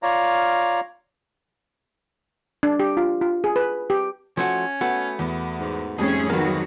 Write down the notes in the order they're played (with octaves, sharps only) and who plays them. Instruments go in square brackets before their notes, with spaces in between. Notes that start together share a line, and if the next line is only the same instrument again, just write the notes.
[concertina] F4 C#5 D5 F5 A#5
[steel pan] D4
G4
F4
F4
G#4
B4
G4
[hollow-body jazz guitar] F3 A3 F#4 [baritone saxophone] C#4
[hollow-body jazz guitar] A3 B3 F#4
[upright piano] E2
[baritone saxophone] G#2
[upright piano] F2 G3 [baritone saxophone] G#2 [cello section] A3 C#4 G#4
[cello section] D#3 F#3 F#4 [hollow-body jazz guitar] A#3 B3